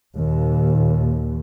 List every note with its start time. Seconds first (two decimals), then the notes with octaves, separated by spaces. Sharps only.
0.15 D#2 A#2